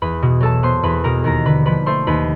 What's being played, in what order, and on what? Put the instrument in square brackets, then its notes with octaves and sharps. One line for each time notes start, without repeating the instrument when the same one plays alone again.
[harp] E2 B4 B5
B2
F#3 A4 A5
B3 C5 C6
E2 B4 B5
B2 A#4 A#5
D#2 A#4 A#5
D3 B4 B5
F3 B4 B5
A3 C5 C6
D#2 B4 B5